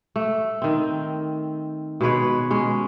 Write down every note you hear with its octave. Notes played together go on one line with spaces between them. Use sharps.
A3
D#3 C4
B2 G#3 B4 C#5
G#3 C#4